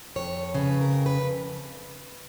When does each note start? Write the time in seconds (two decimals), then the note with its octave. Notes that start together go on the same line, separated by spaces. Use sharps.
0.16 F2 C#5
0.55 C#3 B4
0.81 A#4
0.93 F2
1.06 B4